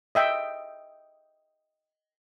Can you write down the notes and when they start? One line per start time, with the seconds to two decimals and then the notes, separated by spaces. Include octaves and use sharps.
0.15 D#5 E5 G5